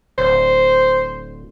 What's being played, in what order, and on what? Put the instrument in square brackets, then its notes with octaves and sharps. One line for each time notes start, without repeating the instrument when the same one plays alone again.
[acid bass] D1 [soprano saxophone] C5